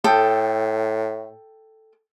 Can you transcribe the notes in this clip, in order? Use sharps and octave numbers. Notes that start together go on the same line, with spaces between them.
A2 A4 G5 D#6